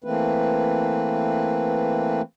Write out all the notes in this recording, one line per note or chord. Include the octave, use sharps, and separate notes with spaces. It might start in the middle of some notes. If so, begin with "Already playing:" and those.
E3 A3 A#3 C4 B4